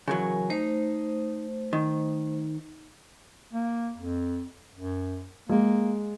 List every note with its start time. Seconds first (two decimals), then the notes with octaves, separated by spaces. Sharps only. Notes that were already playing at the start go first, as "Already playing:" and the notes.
0.08 C#3 E3 F#3 A#4 G#5
0.50 A3 D#4 C5
1.73 D#3
3.53 A#3
3.98 F2
4.75 F#2
5.49 G#3 A#3